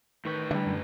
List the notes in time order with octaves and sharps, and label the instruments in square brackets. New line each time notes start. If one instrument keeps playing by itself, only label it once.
[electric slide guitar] A2 B4 [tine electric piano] D#3 C#6 G6
[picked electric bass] D3 [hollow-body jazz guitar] G3 E5
[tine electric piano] F#2